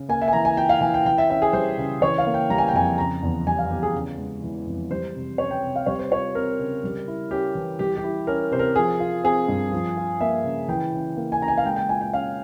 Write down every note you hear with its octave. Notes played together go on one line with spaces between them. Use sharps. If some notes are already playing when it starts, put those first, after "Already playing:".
Already playing: C#3
A#3 G#5
E5
G#5
E3 A#5
G#5
F4 G5
F5
E3 G#5
G5
E3 G5
E5
C#4 E5
G#4
G3 C5
C#3
E3 C#5
F5
A#3
G5
G3 A#5
G#5
G5
F2 G#5
C#3 A#5
E2
G3 G#5
F5
E2 G4
G#4
C#3
G#3
E3
F2
G3 C5
C3
C#4 C#5
G5
C3
F5
G3 C#5
C5
F4 C#5
C4 A#4
C#3
G3
E4
C#4 G4
E3
G3 G4
G4
E4
C#4 A#4
C3 C5
A#4
F3 G#4
F4
C4 G#4
G2
F3
F4
A#3 E5
C#3
E3 G5
C#3
A#3
G#5
C#3 A#5
G#5
F5
G#3 G5
G5
F4 G#5
G5
C#4 F5